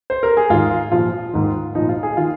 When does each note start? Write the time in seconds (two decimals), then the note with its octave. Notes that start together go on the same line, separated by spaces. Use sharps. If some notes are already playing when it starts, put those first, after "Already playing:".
0.10 C5
0.23 A#4
0.37 G#4
0.50 G#2 D#3 F4
0.92 A#2 F3 F4
1.33 G#2 D#3
1.75 A#2 F3 D#4
1.89 F4
2.03 G#4
2.17 D#3 F4